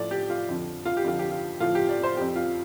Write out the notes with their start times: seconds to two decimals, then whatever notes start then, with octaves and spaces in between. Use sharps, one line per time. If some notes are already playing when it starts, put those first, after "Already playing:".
Already playing: A2 F3 D5
0.11 G4
0.30 F4
0.49 F2 D3 F3
0.85 F4
0.97 G4
1.04 F2 D3 F3 F4
1.19 G4
1.31 F4
1.60 A2 F3 F4
1.75 G4
1.89 D5
2.03 C5
2.17 F2 F3 G4
2.36 F4